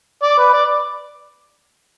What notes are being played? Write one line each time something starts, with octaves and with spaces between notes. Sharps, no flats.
D5
B4
D5